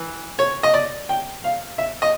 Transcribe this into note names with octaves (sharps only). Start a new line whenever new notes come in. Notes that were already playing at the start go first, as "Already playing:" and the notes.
Already playing: E3
C#5
D#5
D5
G5
F5
E5
D#5